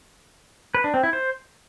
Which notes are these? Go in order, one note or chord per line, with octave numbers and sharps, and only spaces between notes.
B4
D4
C4
E4
C5